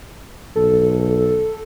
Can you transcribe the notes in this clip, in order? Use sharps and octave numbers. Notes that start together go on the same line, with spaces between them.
B1 A4